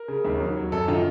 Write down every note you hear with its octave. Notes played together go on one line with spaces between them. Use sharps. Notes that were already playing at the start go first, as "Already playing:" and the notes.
Already playing: A#4
C#3
D#2
F#3
F#3
F#2 A4
D#3 F4